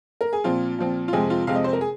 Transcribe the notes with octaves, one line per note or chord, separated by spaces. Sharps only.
A#4
G#4
A#2 F3 C4 F4
A#2 F3 C4
F4
F2 C3 G#3 C4 G#4
F4
F2 C3 G#3 C4 F5
D#5
C5
A#4
G#4